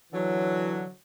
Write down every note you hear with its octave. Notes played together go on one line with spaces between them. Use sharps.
D3 E3 F#3